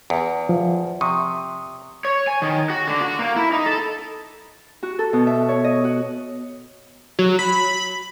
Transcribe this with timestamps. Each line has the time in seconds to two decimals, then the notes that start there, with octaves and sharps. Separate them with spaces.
0.10 E2
0.49 F3
1.01 C3 C#6 D#6
2.05 C#5
2.28 G#5
2.42 D#3
2.70 F#4
2.88 D3
3.01 F#4
3.19 A#3
3.36 E4
3.52 D#4
3.66 A4
4.83 F#4
4.99 A4
5.13 B2
5.27 E5
5.49 C#5
5.64 D#5
5.84 F#4
7.19 F#3
7.39 B5